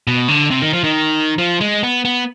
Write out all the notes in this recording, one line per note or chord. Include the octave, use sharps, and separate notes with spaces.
B2
D3
C3
D#3
F3
D#3
F3
G#3
B3
B3